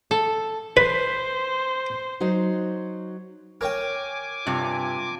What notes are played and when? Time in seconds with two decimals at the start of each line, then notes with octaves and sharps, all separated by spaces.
0.11 A4
0.77 B4 C5
2.20 F#3 D#4 F#4 C5
3.61 A#4 C#5 G5 G#5 D6
4.46 G2 C3 F4